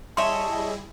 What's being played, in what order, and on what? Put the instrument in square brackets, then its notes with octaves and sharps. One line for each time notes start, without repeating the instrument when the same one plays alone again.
[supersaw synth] G3 E4 G#4 [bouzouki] C#5 D#5 E5 [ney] A5 [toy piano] C6